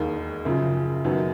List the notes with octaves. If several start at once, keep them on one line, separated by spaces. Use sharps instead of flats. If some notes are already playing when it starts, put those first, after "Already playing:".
Already playing: E1 D#2 D#3
F#2 C#3 F3
F#2 D#3 F#3 B3